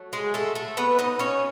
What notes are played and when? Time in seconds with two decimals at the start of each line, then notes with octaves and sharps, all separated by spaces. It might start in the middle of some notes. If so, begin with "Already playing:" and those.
Already playing: F#3 A3
0.13 G#3 G#4
0.34 A3 A4
0.55 A3 A4
0.77 B3 B4
0.99 D#4 D#5
1.19 C#4 C#5